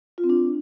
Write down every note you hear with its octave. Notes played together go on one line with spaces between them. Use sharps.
F4
C4
D4